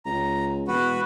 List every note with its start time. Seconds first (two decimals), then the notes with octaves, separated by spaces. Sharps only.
0.05 C#2 A#5
0.68 E1 F#4 B4